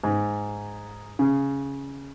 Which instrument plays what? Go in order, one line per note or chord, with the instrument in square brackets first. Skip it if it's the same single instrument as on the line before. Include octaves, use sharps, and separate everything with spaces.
[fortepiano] G#2
C#3